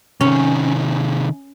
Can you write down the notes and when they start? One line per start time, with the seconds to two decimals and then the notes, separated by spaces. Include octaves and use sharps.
0.21 C3 D#3 C#4